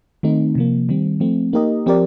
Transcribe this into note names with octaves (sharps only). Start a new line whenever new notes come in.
D#3 A3 C4 D#4
C3 F3 A#3
D#3 G3 C4
F3 A3 C4
A#3 D#4 G4 A#4 D#5
F3 C4 G4 A#4 D5